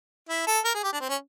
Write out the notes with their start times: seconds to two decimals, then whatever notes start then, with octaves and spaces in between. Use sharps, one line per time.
0.29 E4
0.47 A4
0.65 A#4
0.75 G#4
0.83 G4
0.93 D4
1.01 C4
1.09 C#4